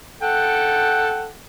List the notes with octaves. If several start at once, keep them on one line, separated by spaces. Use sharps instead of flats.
A4 F#5 G5